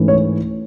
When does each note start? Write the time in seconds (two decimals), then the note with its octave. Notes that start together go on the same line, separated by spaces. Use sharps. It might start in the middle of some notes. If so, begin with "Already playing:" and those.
Already playing: G#2 E3 A3 C#4
0.08 C#5